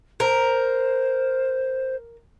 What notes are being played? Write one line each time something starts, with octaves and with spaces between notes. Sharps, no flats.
A#4 C5